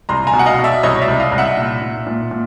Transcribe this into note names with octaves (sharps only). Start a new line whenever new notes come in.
C2 A#5 C6
G#5 A#5
B2
F#5
D#5 F5
B2
D5 E5
C2 C#5 D#5
D5 E5
C2
D#5 F5
C2
E5 F#5
A#2
A#2
A#2
A#2